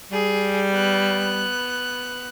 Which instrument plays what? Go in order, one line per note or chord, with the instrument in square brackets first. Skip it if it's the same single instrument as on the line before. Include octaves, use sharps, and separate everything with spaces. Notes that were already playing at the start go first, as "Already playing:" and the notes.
[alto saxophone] G3 [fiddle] G#4
[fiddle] B3 F#6